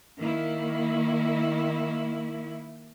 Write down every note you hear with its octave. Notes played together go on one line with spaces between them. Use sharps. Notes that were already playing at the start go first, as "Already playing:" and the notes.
D#3 A#3 E4